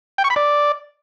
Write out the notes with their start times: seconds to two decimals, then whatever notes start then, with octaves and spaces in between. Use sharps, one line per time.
0.18 G5
0.24 C#6
0.30 B5
0.36 D5